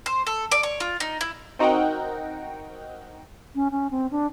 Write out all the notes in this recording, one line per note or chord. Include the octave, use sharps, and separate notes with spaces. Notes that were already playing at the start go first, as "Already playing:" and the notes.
C5
A4
D5
C#5
F4
D#4
E4
C4 D#4 F#4 A#4 F#5 G5
C#4
C#4
C4
D4